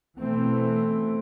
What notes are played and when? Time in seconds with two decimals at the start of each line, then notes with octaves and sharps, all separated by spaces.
0.20 B2 E3 A3 C4